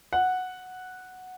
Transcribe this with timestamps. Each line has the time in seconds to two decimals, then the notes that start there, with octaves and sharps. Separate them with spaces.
0.13 F#5